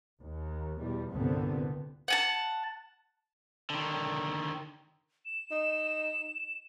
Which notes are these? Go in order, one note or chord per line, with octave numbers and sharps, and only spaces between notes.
D#2
E2 B2 G3
C2 G2 A#2 D3 B3 C4
F#5 G#5 A5
D3 D#3
E7
D#4